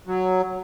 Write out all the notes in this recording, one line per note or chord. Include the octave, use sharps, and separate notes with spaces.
F#3